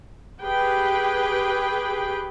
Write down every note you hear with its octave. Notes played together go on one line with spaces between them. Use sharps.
G4 G#4 B4 G5